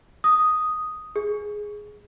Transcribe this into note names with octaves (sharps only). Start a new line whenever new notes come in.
D#6
G#4